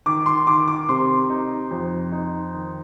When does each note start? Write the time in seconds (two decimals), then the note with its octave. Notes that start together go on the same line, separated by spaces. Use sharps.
0.06 D#3 D6
0.26 C6
0.47 D#3 D6
0.68 D6
0.89 C3 C6
1.30 D#4
1.71 F2
2.12 D#4
2.54 D#3